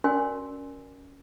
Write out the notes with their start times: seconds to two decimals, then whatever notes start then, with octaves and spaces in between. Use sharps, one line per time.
0.04 C#4 F#4 A#4 D5 G#5 C6